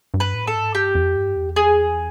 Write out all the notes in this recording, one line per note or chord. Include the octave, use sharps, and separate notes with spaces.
G2
B4
A2
A4
G#2
G2 G4
F2
G2
E2
G#4